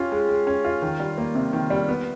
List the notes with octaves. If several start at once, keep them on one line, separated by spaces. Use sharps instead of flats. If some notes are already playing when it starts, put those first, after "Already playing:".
Already playing: C#4 F4 G4
G#3
G#3
C#4
F4
D#3
G3
A#3
C3
D#3
G3
B3